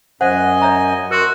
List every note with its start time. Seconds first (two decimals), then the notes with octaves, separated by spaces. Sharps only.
0.21 F#2 C5 D#5 F#5 G#5
0.62 C#5 E5 A#5
1.11 F#4 A#4 C6